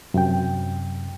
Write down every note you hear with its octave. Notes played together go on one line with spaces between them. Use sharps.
F#2 C3 G5